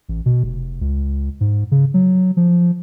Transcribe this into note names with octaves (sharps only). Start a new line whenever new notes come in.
A1
B2
F1
C#2
G#2
C#3
F#3
F3